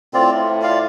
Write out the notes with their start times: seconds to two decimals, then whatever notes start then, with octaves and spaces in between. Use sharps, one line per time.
0.14 A2 C4 F4 D5
0.62 F4 D5 F5